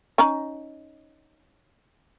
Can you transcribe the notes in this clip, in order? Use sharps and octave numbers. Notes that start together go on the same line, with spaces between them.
C#4 D#4 A#5